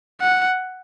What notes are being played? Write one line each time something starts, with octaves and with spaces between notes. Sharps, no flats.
F#5